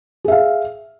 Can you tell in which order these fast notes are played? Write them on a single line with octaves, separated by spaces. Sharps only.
G#4 E5 F5